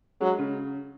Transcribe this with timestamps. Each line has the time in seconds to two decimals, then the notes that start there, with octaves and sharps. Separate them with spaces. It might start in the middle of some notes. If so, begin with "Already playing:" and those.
0.21 F#3 G#3
0.39 C#3